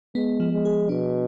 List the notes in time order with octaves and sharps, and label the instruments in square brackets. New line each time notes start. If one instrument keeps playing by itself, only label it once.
[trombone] G#3 [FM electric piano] B3
[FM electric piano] F3
[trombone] G#3
[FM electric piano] G#4
[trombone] B2 [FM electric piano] D4